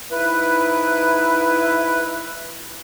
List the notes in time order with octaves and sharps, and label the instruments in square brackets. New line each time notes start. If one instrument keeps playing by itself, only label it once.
[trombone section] G#2 D#4 E4 [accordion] B4